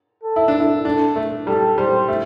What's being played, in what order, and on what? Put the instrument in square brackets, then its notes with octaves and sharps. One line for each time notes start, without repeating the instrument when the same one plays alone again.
[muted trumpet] A4
[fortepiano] E4
D4
[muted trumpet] A4
[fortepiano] E4
D4
A3
[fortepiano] G3 [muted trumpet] A4
[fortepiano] G3 [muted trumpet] C5
[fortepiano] A3